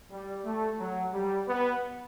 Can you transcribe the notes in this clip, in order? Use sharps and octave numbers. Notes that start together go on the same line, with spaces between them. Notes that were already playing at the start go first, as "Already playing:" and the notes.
G3
A3
F#3
G3
B3